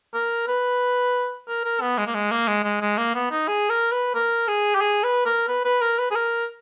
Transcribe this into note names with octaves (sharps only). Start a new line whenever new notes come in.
A#4
B4
A#4
A#4
B3
G#3
A#3
G#3
A#3
G#3
G#3
G#3
A#3
B3
D#4
G#4
A#4
B4
A#4
G#4
G4
G#4
B4
A#4
B4
B4
A#4
B4
G#4
A#4